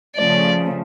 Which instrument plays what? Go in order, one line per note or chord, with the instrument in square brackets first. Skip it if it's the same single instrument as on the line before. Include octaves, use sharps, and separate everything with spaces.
[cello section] C#3 F3 A3 [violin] D5